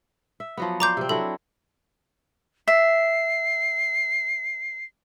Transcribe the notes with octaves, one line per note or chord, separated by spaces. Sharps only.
E5
F3 F#3 B3
C5 D5 A#5 D6 G6
C3 C4
F#3 D4 E4 A4
E5 C7